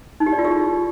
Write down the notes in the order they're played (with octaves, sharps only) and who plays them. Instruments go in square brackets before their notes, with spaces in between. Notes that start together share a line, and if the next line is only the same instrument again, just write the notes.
[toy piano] D#4
G4
D5
F4
G#4